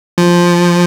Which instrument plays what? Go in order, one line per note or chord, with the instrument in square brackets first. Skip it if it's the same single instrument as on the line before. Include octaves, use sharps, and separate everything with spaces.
[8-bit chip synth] F3